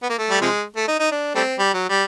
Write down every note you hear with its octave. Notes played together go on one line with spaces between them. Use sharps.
B3
A#3
A3
G3
C3 F3 G#3
A3
D#4
D#4
D4
G3 A3 C4
G3
F#3
G3